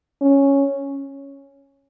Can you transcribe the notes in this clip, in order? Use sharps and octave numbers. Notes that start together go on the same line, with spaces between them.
C#4